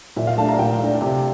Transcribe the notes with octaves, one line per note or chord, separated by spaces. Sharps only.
A#2 E5
F5
A3 D4 A5
A#5
F5
A#2 G5
A3 D4
C3